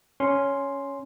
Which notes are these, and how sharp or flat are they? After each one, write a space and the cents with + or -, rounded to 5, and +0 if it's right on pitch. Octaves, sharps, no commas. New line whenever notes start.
C#4 +5 C6 +0